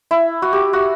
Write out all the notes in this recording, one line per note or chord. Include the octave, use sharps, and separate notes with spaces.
E4
F#4
G4
F#4